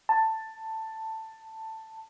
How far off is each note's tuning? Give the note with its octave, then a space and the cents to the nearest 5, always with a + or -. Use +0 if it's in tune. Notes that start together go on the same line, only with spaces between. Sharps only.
A5 +10